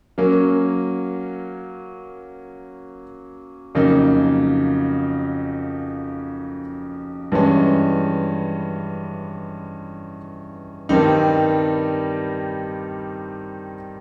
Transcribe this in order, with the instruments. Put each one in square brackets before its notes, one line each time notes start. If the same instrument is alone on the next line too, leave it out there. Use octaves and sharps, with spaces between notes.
[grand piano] F#3 A#3 C#4
F2 C#3 F#3 A#3 D#4
G2 E3 G#3 C#4
G2 D#3 G3 C4 D#4